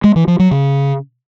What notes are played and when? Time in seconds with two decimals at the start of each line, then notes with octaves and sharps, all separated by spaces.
0.04 G#3
0.16 E3
0.28 F3
0.39 F#3
0.51 C#3